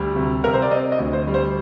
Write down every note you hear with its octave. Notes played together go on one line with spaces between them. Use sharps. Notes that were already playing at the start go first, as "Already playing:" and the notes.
Already playing: D2 G3
C3
C3 A#4
C5
D5
C4 D#5
D#5
D2
C5
G3
C5